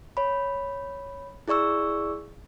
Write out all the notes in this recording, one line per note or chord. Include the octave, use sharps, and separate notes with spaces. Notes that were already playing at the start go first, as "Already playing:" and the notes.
C#5 B5
E4 G#4 D5 C#6 E6